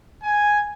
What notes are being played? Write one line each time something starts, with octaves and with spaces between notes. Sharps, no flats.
G#5